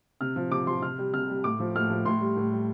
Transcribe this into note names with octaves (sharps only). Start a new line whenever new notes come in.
C3 F6
F3
C3 D6
F3 C6
C3 F6
G3
C3 F6
G3
A2 D6
F3
A2 F6
F3
A2 C6
G3
A2
G3